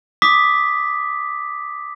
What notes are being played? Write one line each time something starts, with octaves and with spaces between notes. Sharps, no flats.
D6 D#6 B6